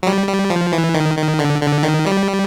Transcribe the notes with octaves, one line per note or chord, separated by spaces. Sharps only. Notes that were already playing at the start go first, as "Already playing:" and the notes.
F#3
G3
G3
F3
E3
D#3
D#3
D3
D3
D#3
G3